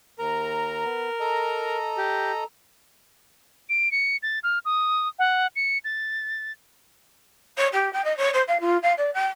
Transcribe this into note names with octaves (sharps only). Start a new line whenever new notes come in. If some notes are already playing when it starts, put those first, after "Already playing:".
D#2 A#4 A#5
B3
A4 D#5 A#5
G4
D7
C#7
A6
F6
D#6
F#5
C#7
A6
C#5
G4
G5
D#5
C#5
C5
F5
F4
F5
D5
G5